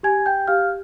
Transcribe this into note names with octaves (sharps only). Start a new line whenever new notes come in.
G4 G#5 G#6
G5 G6
G4 F5 F6